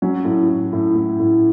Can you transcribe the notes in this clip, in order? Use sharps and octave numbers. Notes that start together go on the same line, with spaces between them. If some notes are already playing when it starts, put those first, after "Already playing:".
F#3 C#4
A2
A2
A2
A2
A2